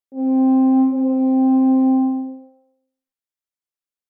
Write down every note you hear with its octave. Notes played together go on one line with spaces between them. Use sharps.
C4
C4